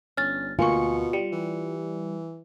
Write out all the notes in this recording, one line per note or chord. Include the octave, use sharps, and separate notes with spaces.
G1 C#4 F6 A6
D2 B2 A#3 F4 G#5 C#6 C#7
G3 C#7
E3